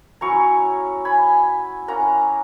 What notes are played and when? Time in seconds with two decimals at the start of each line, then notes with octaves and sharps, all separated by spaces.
0.21 F#3 C#4 E4 A#5 C#6
1.05 G#5 B5
1.88 A#3 C#4 E4 F#5 A#5